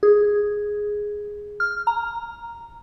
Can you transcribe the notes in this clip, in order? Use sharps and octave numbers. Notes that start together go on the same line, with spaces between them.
G#4
F6
A#5